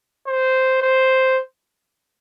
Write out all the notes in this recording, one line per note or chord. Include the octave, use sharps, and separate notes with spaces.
C5
C5